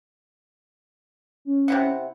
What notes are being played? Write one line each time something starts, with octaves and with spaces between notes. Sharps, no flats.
C#4
C3 E4 F#5